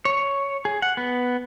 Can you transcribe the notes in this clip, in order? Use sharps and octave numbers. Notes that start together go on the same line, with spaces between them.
C#5
G#4
F#5
B3